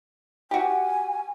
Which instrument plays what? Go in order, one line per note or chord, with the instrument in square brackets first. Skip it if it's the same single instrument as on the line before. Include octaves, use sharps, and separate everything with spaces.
[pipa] F#4 G4 [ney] G#5